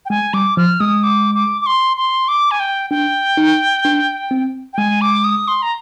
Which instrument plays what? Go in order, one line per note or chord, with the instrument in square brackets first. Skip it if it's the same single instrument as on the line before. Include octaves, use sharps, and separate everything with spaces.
[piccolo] G5
[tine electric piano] G#3 [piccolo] G#5
[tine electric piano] G3 [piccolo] D6
[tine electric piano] F3 [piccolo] F6
[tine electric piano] G#3 [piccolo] D#6
[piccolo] D6
D6
D6
C6
C6
D6
G#5
G5
[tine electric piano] D4 [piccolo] G5
[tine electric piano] D#4
D4
C4
[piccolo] G5
[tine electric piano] G#3 [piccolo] G#5
[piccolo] D6
D#6
C6
A#5